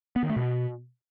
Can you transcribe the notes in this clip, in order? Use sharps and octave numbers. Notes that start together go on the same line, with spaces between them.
B3
D#3
A3
B2